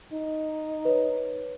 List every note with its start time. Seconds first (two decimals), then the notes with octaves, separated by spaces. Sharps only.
0.13 D#4
0.85 B4 C#5